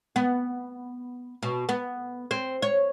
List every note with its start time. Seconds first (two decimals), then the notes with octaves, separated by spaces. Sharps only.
0.16 B3
1.43 B2
1.69 B3
2.31 C4
2.62 C#5